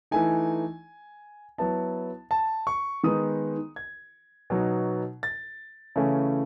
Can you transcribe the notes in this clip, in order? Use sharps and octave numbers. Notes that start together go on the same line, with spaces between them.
E3 A3 D#4 G#5
F#3 B3 E4 A5
A5
C#6
D#3 G#3 B3 D#4 D#6
G#6
B2 F#3 B3 D#4
A6
C#3 E3 A3 C#4 E4